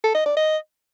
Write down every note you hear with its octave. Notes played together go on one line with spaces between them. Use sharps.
A4
D#5
D5
D#5